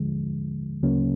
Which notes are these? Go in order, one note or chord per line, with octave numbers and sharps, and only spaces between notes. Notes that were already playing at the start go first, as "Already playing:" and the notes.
Already playing: D#2 D3 F3 G#3
D2 C#3 F#3 A#3 C#4